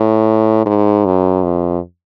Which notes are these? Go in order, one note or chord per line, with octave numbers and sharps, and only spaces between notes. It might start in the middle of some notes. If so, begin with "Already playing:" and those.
Already playing: A2
G#2
F#2
F2